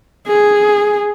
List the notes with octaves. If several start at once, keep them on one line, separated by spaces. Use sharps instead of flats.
G#4